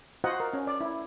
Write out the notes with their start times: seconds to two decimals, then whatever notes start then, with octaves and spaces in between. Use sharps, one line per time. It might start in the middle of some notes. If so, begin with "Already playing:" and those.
0.24 F4 F#4 C5 D#5 F#5
0.40 A#4
0.53 C#4
0.67 D5
0.81 E4